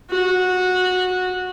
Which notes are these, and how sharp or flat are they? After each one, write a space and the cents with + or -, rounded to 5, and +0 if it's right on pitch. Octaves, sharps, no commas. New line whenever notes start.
F#4 -15